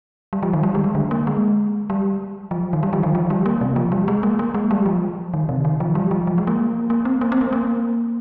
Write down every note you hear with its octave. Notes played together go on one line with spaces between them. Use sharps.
G3
F3
D#3
G3
G#3
G3
D3
A#3
G#3
G3
F3
D#3
G3
F3
D#3
F3
G3
A#3
C3
F3
G3
G#3
A#3
A#3
G#3
G3
F3
D#3
C3
D#3
F3
G3
F3
F3
G#3
A#3
A#3
C4
A#3
C4
A#3
A#3